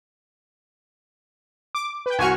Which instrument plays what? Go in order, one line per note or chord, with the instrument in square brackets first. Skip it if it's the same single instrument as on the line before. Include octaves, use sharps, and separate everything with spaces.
[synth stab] D6
B4 G5
[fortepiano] C2 F#4 [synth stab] G#5 C#6 F6